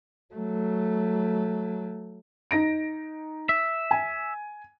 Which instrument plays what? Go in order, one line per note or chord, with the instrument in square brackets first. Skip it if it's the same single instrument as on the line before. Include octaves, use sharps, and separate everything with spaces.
[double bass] F#3 A3
[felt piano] D#4 A#6 D7
[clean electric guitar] E5
[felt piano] G#5